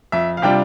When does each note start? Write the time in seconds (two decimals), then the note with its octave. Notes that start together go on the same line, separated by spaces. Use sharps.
0.12 F2 E5
0.37 F5
0.42 C3 G3 D4 F4 G5